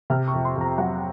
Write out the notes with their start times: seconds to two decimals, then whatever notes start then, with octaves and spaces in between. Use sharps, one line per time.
0.10 C3 F6
0.28 C#6
0.34 F2
0.45 C6
0.56 F2 A#5
0.78 F#3 F#5